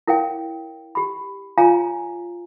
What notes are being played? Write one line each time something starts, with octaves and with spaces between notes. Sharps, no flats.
E4 A#4 C#5 F5 G5
G4 B5
F4 C#5 F5 G#5 A#5